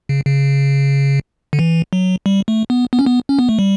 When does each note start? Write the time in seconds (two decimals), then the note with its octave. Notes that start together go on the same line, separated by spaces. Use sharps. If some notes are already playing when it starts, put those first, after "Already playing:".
0.09 C#3
0.26 C#3
1.53 D3
1.59 E3
1.93 F#3
2.26 G3
2.48 A3
2.70 B3
2.93 B3
2.99 C#4
3.06 B3
3.29 C#4
3.39 B3
3.49 A3
3.59 G3